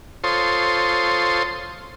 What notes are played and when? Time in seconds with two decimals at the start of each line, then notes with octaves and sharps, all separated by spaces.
0.24 F4 A4 C5 C#5 C6 D#6